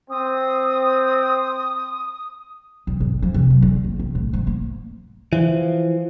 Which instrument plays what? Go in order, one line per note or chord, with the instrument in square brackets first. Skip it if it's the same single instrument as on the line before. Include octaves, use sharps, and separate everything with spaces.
[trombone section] C4 [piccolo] D#6
[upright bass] B1
G#1
F3
C3
F#3
D3
A#3
B1
A2
G#2
A#3
[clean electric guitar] E3 F3